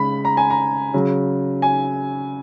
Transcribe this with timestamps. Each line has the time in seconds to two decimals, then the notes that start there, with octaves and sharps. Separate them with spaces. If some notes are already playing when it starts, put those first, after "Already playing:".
Already playing: C#3 G#3 B5
0.25 A#5
0.37 G#5
0.50 A#5
0.94 C#3 F#3
1.62 G#5